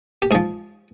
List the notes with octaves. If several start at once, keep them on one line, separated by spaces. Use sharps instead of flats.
G4
G#2 F3 G#4